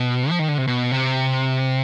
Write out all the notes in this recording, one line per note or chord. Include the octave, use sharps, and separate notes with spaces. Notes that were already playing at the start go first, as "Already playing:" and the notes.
Already playing: B2
F3
D#3
D3
C3
B2
C3